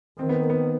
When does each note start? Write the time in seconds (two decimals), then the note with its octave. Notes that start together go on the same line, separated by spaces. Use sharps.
0.19 D#3 C4
0.29 B3
0.40 A#3
0.49 B3